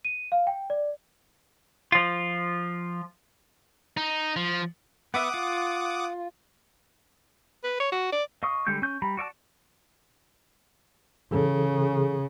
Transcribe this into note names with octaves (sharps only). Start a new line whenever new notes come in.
D#7
F5
G5
D5
F3 F4
D#4
F3
B3 B4 E5 F#5 D6 D#6
F4
B4
C#5
F#4
D5
D#5 F5 C#6 D#6
D3 G3 G#3 G6
C#4 G6
G3 A#5 B5
F#4 D5 E5 A5
C#3 E3 G#4 A4